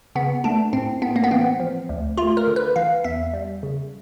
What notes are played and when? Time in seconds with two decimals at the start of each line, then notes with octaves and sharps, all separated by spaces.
0.15 C#3 B3
0.44 A3 D4
0.73 A2 C4
1.02 A2 B3
1.16 A#3
1.24 B3
1.31 E3 C4
1.60 F3
1.89 D2
2.18 A3 F4
2.37 A#4
2.47 D3
2.56 B4
2.76 E3 F5
3.04 E2 E5
3.34 G3
3.63 C#3